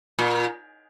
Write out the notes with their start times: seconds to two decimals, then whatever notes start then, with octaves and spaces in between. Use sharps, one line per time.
0.19 A#2